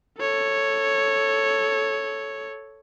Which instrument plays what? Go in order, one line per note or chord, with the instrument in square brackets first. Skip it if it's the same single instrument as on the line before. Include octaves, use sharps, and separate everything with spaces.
[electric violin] A4 C#5